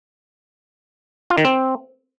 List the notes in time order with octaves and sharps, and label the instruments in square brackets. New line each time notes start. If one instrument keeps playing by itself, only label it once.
[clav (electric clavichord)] F4
D#3
C4